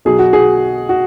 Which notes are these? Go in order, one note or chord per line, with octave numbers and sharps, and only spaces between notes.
B1 B2 F#3 G#4
F#4
G#4
F#4